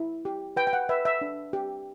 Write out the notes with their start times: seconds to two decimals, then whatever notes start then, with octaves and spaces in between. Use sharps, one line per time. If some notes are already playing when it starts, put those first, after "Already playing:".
Already playing: E4
0.25 G4
0.57 B4 G5
0.67 G5
0.73 F#5
0.89 B4 E5
1.05 E5
1.21 D4
1.53 G4